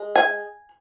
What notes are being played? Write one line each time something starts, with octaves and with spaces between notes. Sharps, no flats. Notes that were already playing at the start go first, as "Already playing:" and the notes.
Already playing: G#3
G#5